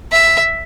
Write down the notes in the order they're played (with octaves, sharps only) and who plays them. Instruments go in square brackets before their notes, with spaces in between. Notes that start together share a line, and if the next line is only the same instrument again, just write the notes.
[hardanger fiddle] E5